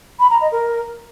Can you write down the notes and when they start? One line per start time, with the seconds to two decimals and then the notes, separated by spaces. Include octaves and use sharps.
0.19 B5
0.30 A#5
0.41 D#5
0.52 A#4